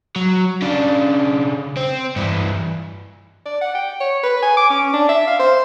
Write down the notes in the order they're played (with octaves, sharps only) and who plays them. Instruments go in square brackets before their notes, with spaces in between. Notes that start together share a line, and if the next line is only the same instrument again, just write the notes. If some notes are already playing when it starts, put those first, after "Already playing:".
[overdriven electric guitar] F#3
C#3 D4
C4
G2 E3
[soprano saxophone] D5
F#5
G5
C#5
B4
G#5
D6
C#4
D4
E5
F5
C5